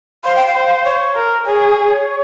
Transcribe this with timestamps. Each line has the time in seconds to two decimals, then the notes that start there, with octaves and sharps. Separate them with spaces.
0.25 C5 F5
0.36 G5
0.46 F5
0.56 C5
0.85 C#5
1.16 A#4
1.46 G#4 C#5